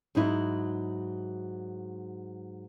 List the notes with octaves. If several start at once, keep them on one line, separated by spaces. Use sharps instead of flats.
G#2 F#3 D#4 E4